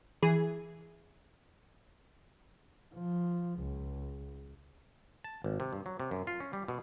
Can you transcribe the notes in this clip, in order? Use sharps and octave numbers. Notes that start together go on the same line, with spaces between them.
E3 G#4
F3
C#2
A5
G#1
C3
G2
F#3
C3
F#2
F4
C#4
G3
B2